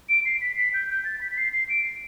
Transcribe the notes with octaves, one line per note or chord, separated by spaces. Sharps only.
D7
C7
B6
B6
G6
G6
A6
B6
B6
C7
C7
D7